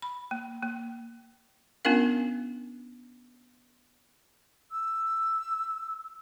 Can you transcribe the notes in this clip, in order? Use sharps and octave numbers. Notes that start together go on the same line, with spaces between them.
B5
A#3
A#3
B3 C#4 D4 F4 A#4 F5
E6